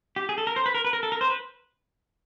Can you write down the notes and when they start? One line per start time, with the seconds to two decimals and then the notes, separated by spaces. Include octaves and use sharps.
0.16 G4
0.29 G#4
0.38 A4
0.47 A#4
0.56 C5
0.66 B4
0.74 A#4
0.85 B4
0.93 A#4
1.03 A4
1.12 A#4
1.21 C5
1.30 B4